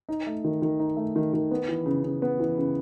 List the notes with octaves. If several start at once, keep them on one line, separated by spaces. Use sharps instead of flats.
D#4
A3
D#3
D#3
D#4
A3
D#3
D#3
B3
E3
C#3
C#3
B3
E3
C#3